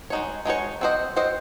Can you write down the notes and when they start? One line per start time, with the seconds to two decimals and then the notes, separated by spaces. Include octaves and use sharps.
0.10 G#3 D#4 F#4 C#5
0.45 G#3 D#4 F#4 C#5
0.81 C4 F#4 C5 D#5
1.16 C4 F#4 C5 D#5